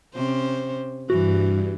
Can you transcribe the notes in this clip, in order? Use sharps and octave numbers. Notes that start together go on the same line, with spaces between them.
C3 C#4 C5
G2 E3 F#4